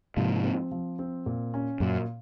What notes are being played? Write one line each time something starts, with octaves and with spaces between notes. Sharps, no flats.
G#2 C3 F3
C4
F3
C4
A#2
C#4
F#2 A#2